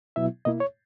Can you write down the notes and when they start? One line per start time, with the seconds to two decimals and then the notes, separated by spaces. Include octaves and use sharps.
0.16 B2 F#3 B3 E4 E5
0.45 B2 A#3 E4 D#5
0.60 C#5